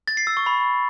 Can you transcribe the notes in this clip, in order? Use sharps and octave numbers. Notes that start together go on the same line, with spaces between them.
A6
C7
E6
C#6
B5